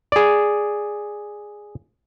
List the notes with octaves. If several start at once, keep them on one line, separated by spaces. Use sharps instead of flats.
G#4 D5